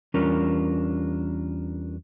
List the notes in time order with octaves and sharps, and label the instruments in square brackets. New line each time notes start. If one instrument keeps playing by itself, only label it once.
[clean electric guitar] E2 G3 C#4 D4 F4 A#4